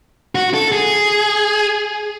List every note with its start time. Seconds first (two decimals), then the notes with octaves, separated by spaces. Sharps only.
0.35 F#4
0.54 A4
0.72 G#4